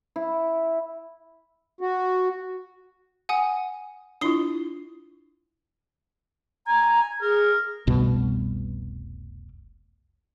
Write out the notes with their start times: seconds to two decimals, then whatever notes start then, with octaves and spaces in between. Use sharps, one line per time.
0.16 E4
1.81 F#4
3.29 F#5 G#5 D#6
4.21 D4 E4 F4 D#6 C7 G7
6.67 G#5 A#5
7.22 G#4 A#4
7.87 F1 C2 B2 G3